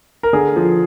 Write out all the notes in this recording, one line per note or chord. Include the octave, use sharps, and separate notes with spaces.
A#4
D3 G#4
F3